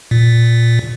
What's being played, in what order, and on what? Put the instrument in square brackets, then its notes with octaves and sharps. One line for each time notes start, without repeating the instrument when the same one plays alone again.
[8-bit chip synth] A#2